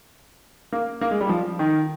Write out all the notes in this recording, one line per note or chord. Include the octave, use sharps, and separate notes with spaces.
A#3
A#3
G#3
G3
F3
D#3